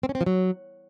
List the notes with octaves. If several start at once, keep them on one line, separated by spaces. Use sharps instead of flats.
C4
C#4
C4
F3
F#3